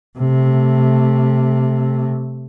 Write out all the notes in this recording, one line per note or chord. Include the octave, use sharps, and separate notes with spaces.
C3 A3